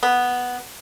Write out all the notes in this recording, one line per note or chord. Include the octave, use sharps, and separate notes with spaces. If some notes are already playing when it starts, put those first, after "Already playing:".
B3